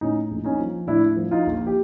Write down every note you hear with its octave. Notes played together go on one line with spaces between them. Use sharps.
A2 C#4 D#4
A#1
C#4 D#4
F3
A2 D4 E4
F3
D#4 F4
A#1
G4